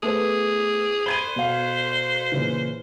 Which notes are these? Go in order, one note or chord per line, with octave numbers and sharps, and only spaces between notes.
A3 B3 G#4 C5
C5 B5 G#6 D#7
B2 F5
A#2 C#3 E3